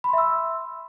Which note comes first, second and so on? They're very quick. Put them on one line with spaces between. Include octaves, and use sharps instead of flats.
B5 C6 E5 E6